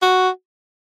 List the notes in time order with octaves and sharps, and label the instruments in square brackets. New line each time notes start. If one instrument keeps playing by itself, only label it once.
[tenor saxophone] F#4